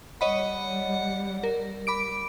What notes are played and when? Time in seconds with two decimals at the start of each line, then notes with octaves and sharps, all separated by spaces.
0.21 G3 C#5 D#5 F#5 B5
1.43 A#4
1.87 B5 D6 D7